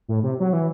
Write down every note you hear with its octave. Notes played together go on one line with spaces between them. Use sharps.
A2
C3
F#3
E3